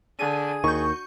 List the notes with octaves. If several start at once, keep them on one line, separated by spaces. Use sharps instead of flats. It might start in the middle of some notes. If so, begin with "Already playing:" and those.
D3 G#4 D#7
D#2 D#3 F#4 C#6 G6